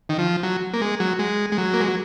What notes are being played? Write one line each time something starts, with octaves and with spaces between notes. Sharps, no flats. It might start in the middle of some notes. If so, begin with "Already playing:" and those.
D#3
F3
F#3
A#3
G#3
F#3
G#3
G#3
F#3
A#3
G#3
F#3